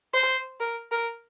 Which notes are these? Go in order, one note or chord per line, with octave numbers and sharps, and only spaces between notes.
C5
A#4
A#4